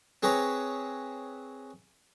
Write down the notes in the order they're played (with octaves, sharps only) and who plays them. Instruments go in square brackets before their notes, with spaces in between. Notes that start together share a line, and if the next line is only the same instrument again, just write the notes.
[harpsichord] C4 G#4 B4 C#5 A#5